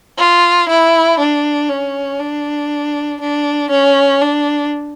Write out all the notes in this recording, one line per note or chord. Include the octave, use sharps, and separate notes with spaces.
F4
E4
D4
C#4
D4
D4
C#4
D4